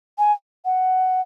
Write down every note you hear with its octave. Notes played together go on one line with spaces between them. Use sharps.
G#5
F#5